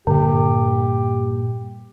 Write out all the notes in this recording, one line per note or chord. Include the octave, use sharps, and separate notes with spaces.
G2 A#2 D3 G4